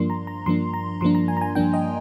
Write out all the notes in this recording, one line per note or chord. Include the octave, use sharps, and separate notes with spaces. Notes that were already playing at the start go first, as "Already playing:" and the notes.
Already playing: G2 F3 A#3 D4 C6
A#5
A#5
G2 F3 A#3 D4 C6
A#5
G2 F3 A#3 D4 C6
A#5
G#5
A#5
G#5
G2 F3 A#3 D4 G5
D#5